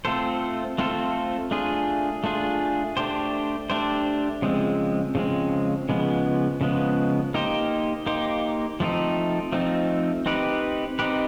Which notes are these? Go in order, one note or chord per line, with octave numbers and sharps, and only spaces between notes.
A3 C4 F4 A4 C5
A3 C4 F4 A4 C5
A3 D4 F4 G#4
A3 D4 F4 G#4
A3 D4 G4 C5
A3 D4 G4 C5
C#3 F3 G#3 C4
C#3 F3 G#3 C4
C#3 F3 G#3 B3
C#3 F3 G#3 B3
A#3 D#4 G4 C5
A#3 D#4 G4 C5
F3 A3 C4 D#4
F3 A3 C4 D#4
C4 D#4 G4 B4
C4 D#4 G4 B4